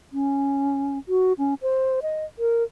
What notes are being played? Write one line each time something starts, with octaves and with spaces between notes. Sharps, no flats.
C#4
F#4
C#4
C5
D#5
A#4